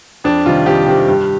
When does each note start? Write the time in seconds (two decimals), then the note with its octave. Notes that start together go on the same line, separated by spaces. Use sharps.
0.24 F2 D4
0.46 C3 D#3 G3 F4
0.66 F2 G4
0.87 C3 D#3 G3
1.08 G2